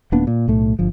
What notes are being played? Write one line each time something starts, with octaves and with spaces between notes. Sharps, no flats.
D#1 A#3 B3 D4
A#2
B1 A2 A3
G1 F3